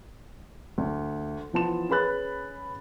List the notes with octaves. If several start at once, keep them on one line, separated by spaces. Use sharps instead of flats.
D2
E3 F3 B3 A5 C6 E7
C#4 G#4 B4 B5 F#6 A6